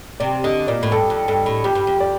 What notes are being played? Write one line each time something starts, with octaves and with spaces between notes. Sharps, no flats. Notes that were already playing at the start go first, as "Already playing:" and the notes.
C3 D5
D3 D#5
A#2 D5
A2
G2 A4
F2
G2 A4
A2
F2 G4
G2
F2
D5